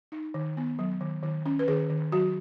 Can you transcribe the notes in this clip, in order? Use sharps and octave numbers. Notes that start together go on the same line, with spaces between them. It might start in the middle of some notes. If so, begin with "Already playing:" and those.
D#4
D#3
B3
F#3
D#3
D#3
C#4
B4
D#3 G#4
D#3
F#3 F#4